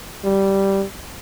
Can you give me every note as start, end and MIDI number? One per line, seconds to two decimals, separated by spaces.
0.24 0.83 55